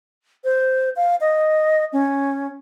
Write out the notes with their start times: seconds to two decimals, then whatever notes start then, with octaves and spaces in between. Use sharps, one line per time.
0.44 C5
0.96 F5
1.21 D#5
1.93 C#4